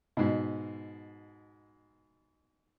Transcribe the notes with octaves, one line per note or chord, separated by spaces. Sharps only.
G#2 B2